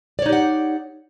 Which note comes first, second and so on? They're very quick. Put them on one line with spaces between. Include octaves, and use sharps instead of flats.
D5 C#5 D#4 G4 F#5